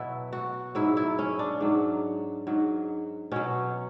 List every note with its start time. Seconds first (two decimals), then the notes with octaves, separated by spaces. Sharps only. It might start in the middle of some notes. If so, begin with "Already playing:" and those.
Already playing: B2 F#3 E4
0.33 F#4
0.75 G#2 F#3 E4
0.97 E4
1.19 C#4
1.39 D4
1.60 G#2 F#3
2.47 G#2 F#3
3.32 B2 F#3 C#4